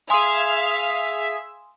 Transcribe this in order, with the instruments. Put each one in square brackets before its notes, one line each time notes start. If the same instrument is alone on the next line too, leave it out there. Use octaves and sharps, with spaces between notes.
[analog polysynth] G#4 E5 [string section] F5 [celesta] G#5 C6 D#6